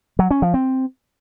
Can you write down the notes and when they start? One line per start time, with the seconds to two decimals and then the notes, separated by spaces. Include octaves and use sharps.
0.19 F#3
0.31 C#4
0.42 F3
0.54 C4